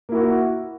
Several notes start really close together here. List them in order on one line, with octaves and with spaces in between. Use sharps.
A#3 E4 F#4